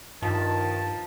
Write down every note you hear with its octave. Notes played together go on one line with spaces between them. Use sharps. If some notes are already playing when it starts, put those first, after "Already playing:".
G2 D#3 F3 A5